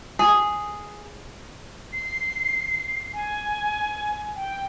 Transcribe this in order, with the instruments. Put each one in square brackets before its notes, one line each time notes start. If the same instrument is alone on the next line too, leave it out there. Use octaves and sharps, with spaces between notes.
[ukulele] G#4
[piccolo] C7
G#5
G5